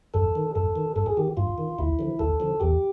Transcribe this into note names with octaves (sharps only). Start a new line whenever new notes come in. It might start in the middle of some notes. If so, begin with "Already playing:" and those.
F#2 A4
D#3
F#2 A4
D#3
G2 A4
G#4
D#3 G4
G2 F4
D#3
D2 E4
D3 F3
D2 A4
D3 F3
E2 G4